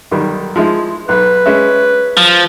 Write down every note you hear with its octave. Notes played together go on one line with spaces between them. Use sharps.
B1 D#3 G3
F3 G#3 E4
B1 B4
G#3 C#4 E5
F3